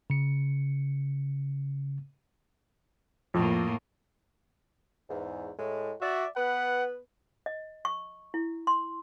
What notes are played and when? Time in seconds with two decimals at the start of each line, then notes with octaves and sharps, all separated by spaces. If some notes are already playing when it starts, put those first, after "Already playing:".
0.10 C#3 C#7
3.34 F2 A2 A#3
5.08 E2 G#2
5.58 A2 G#3
6.01 F#4 D5 E5
6.36 B3 B4 F#5
7.46 D#5
7.85 C#6
8.34 E4
8.67 C6